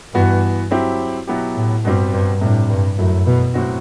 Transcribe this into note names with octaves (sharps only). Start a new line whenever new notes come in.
G2 E3 B3 F#4
F#3 C4 E4 G4
B2 F#3 B3 E4 G4
A2
G2 B2 G3 C4 G4
G2
A2 C3 G3 D4
G2
F#2 F#3 A3 E4
B2
A2 F#3 C4 F#4